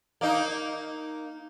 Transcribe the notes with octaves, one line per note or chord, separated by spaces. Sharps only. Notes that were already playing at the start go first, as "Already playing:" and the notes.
A#3 D#4